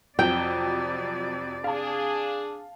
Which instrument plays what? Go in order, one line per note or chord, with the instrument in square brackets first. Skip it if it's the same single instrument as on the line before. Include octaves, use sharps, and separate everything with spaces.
[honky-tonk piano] F2 F#3 [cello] C3 D5 [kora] G5
[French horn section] D4 G#4 [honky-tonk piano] F5 A5